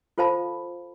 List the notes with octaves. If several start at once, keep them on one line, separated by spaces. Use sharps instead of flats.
F4 A4 C5 F5 A5 B5